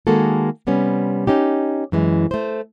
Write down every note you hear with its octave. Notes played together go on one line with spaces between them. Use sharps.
D#3 G#3 A#3 F#4 G#4 A4
C3 G3 B3 C#4
C#4 D#4 G4
F#2 E3 G#3
A3 C5